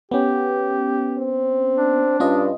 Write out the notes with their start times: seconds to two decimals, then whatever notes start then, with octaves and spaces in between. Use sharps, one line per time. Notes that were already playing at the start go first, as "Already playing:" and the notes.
0.11 B3 C#4 G4
1.18 C4
1.77 D4
2.20 G2 C#4 F4 D#5